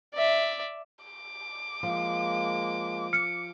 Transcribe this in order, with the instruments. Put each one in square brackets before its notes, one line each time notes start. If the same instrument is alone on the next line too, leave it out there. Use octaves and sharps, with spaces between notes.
[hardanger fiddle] D5 E5
[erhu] D6
[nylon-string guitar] F3 [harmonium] G#3 A#3
[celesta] F6 C#7